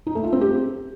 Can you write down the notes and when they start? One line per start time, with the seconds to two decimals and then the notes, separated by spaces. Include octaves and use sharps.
0.07 D#4
0.15 A3
0.24 F4
0.33 C4
0.41 G4